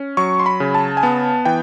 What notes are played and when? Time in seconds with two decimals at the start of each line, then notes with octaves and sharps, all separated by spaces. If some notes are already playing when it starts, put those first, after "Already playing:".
Already playing: C#4
0.17 F#3 C#6
0.39 C6
0.46 B5
0.60 C#3
0.75 A5
0.97 G#5
1.03 B3 A5
1.45 E3 G5